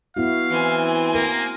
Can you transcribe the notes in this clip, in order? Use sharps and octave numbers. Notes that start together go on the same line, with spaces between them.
B3 E4 F#4 F5
E3 C4 G#5
A#3 A#4